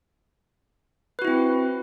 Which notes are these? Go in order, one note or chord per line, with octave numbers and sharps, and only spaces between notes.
C4 E4 F#4 B4